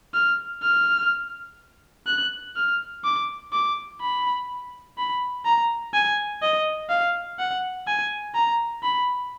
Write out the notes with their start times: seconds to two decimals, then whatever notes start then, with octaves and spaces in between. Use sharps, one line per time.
0.14 F6
0.62 F6
2.07 F#6
2.56 F6
3.04 D6
3.53 D6
4.01 B5
4.97 B5
5.45 A#5
5.94 G#5
6.42 D#5
6.89 F5
7.39 F#5
7.87 G#5
8.35 A#5
8.83 B5